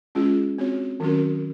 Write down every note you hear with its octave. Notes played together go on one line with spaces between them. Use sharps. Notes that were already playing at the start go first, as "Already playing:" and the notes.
G#3 C#4 F4 G#4
C4 F#4 C#5
D#3 F#3 C#4 F#4 A#4